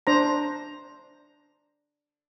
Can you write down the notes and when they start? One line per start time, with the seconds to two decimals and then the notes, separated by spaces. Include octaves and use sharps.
0.07 D4 C5 A#5